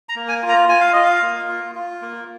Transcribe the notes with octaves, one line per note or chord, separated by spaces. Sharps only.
A#5
A#3
G#5
F4
A#5
F4 G#5
F5
F4 D#5
F5
A#3
F4
F4
A#3